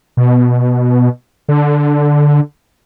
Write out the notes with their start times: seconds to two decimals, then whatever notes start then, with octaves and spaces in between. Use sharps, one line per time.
0.17 B2
1.48 D3